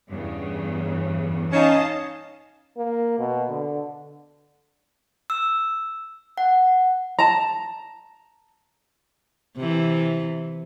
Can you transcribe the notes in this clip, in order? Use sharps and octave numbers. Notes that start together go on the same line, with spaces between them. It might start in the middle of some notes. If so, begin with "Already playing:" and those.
E2 G2 C#3
C#4 D#4 D#5 F5 A5
A#3
B2
D3
E6
F#5
A5 A#5
C3 E3